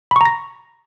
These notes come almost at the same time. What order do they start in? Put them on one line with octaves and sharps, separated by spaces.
B5 C#6 A#5 A#6